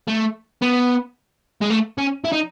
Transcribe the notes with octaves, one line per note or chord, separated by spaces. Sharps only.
A3
B3
G#3
A3
C#4
E4
D#4